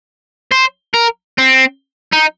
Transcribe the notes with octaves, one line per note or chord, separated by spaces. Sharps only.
C5
A#4
C4
D#4